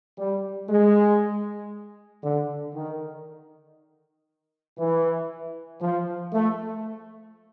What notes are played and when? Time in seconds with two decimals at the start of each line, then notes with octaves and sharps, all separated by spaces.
0.19 G3
0.69 G#3
2.23 D3
2.74 D#3
4.79 E3
5.81 F3
6.33 A3